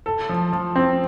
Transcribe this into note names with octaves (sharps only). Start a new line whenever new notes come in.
A4
F3
F3
C4